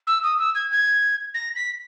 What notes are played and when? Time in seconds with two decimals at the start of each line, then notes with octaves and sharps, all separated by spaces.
0.07 E6
0.23 D#6
0.39 E6
0.55 G#6
0.71 G#6
1.34 A#6
1.56 B6